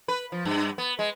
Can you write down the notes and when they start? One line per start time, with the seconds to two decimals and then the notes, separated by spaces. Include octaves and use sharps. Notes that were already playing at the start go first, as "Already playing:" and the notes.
0.08 B4
0.32 F3
0.45 G2
0.78 B3
0.99 G#3